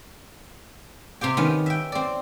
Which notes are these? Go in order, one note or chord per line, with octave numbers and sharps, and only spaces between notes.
C3 C4 G4 G5
D#3 B3 C#4
E5 G5
C4 D5